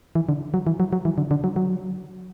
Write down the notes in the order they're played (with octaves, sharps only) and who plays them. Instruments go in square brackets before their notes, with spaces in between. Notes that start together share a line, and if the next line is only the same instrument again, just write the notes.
[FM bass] E3
D3
F#3
E3
F#3
F#3
E3
D3
D3
F#3
F#3